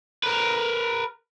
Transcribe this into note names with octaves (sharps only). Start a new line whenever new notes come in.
A#4 B4